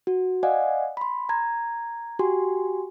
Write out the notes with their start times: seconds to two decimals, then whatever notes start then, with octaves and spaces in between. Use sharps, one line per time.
0.07 F#4
0.43 D5 D#5 F5 F#5 G#5
0.97 B5 C6
1.29 A#5 G#6
2.19 F#4 G4 G#5 C6